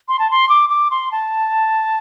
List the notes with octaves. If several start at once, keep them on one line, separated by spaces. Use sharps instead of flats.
C6
A5
C6
D6
D6
C6
A5